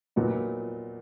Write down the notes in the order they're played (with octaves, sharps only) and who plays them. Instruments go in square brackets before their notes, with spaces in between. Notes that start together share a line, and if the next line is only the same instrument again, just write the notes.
[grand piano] A#2 F#3 B3 D#4